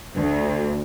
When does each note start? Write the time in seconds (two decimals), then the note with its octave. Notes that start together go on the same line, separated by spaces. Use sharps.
0.15 D2